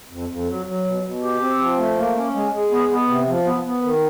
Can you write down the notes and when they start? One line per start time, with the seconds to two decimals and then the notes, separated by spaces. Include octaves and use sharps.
0.10 F2
0.29 F2
0.48 F#3
0.66 F#3
0.85 B2
1.04 B2
1.22 G4
1.40 C4
1.59 F3
1.78 A3
1.97 A#3
2.15 C#4
2.34 G#3
2.52 G#3
2.71 B3
2.89 B3
3.08 C3
3.27 F3
3.45 B3
3.64 B3
3.82 D#3